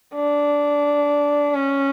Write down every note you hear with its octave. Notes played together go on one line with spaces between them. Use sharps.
D4
C#4